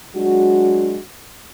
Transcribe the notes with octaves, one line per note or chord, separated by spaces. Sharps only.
F#3 G#3 D4 F#4